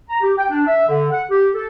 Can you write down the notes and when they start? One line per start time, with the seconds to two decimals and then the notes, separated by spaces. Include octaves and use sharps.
0.09 A#5
0.21 G4
0.38 G5
0.50 D4
0.66 E5
0.88 D3
1.11 F#5
1.30 G4
1.54 A4